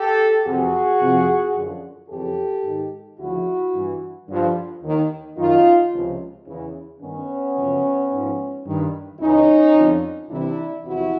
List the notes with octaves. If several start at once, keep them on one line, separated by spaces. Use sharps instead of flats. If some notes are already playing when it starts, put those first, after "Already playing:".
Already playing: G4 A4
F2 C3 E3 F#4 G#4
F2 C3 F3
F#2 D3 F3
F2 C#3 E3 G4 A4
G#2 D#3
D2 C#3 F3 E4 F#4
G2 E3
G2 D3 F3
D#2 D#3
F#2 D#3 D#4 F4
C#2 C3 F3
E2 C#3 E3
G2 D#3 B3 C#4
F#2 C#3 F3
G#2 F3
G2 D#3
C#2 C#3 E3 C#4 D#4
F2 D3 F3
C2 C3 E3 D4 E4
E2 C3 F3 E4 F#4